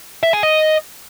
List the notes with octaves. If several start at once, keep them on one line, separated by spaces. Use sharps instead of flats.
E5
G#4
D#5